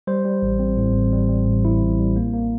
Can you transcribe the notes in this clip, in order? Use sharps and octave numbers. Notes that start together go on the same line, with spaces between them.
G3 C5
G3
A1
C4
A2
A1
G3
G3
A1
A1 E4
A1
G3
A#3
A#3